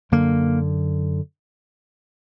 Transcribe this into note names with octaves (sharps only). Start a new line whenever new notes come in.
F#2 D3 A#3